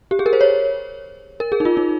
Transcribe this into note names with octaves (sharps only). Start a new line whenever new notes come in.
G4
G#4
A#4
C5
C#5
A#4
G#4
D#4
F4
D#4